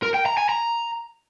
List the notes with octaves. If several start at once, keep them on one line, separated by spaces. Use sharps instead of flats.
A#4
G5
A#5
G#5
A#5